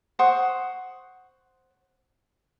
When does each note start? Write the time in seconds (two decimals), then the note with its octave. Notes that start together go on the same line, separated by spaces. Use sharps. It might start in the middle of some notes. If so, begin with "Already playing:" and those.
0.19 C5 F#5 C#6 D#6